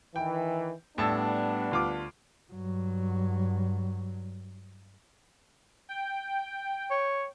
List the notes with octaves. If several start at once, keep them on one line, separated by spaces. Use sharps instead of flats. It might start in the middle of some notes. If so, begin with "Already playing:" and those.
D#3 E3 G5
A2 G3 B3 D4 A5 E6
D2 F4 D6
G2 F#3
G5
C#5